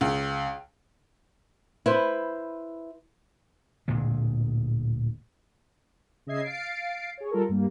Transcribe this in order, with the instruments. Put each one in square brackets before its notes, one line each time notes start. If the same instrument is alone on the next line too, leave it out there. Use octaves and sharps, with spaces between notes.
[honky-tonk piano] C#2
[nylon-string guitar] E4 B4 C5
[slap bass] D1 A#2 D3 G#3
[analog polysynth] C#3 D#5 E5 G#6 C7
F5 A6 C7 D7
G#4 C#5
G3 F4 A4 A#4
G2 G3 A#3